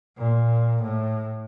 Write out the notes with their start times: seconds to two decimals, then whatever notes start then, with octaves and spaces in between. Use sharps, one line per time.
0.18 A#2
0.83 A2